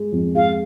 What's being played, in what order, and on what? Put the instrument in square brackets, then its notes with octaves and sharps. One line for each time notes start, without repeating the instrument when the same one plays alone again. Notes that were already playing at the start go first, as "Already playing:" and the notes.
Already playing: [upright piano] G#3
F2
[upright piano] G#3 [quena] F5